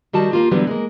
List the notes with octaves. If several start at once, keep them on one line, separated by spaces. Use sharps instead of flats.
D#3 G3 F#4 A5
A#3 F4 G4
D3 E3 F#3 G3 B3
G#3 A#3